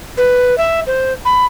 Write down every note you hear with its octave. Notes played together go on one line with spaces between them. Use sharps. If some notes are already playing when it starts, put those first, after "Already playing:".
B4
E5
C5
B5